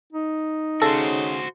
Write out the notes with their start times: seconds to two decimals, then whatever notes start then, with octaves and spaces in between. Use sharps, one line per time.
0.13 D#4
0.82 C#3 F#4 A4 C5